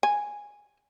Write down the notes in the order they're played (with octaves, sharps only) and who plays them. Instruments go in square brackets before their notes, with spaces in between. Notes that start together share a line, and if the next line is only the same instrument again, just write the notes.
[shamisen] G#5